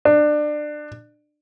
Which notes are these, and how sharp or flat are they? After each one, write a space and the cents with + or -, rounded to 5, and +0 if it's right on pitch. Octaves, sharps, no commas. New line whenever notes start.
D4 +25